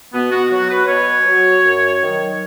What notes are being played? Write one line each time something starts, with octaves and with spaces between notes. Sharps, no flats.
B2 B3
F#4
F#3 F#4
B4
B2 C#5
F#3
F#2
D#3 F#3